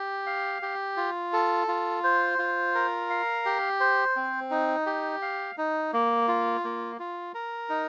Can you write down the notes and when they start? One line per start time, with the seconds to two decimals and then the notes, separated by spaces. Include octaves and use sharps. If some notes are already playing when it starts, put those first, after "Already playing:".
Already playing: G4
0.26 F5
0.62 G4
0.97 F4
1.33 A4
1.68 F4
2.04 C5
2.39 F4
2.75 A#4
3.10 F5
3.45 G4
3.80 C5
4.16 C4
4.51 D#4
4.86 G4
5.22 F5
5.58 D#4
5.93 A#3
6.28 F4
6.64 A#3
6.99 F4
7.35 A#4
7.70 D#4